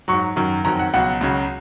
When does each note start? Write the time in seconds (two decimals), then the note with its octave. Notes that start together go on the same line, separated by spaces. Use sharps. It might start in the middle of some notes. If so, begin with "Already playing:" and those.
0.08 G#2 F#3 C#6
0.36 F#2 D#3 F#3
0.64 F2 D#3 F#3 A#5
0.79 F#5
0.94 C#2 B2 F#3 F#5
1.21 C#2 C#3 F#3